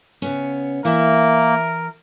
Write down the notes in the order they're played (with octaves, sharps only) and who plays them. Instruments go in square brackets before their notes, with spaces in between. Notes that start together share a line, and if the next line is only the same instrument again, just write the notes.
[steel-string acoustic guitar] C#3 B3 C#4
[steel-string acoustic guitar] E3 E4 E5 [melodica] A#3 [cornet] A#4